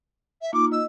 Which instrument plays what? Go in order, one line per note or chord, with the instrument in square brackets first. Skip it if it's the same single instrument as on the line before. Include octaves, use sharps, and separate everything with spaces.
[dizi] E5
[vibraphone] A#3 D#4 F4 [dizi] D6
[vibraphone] D#5 [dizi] E6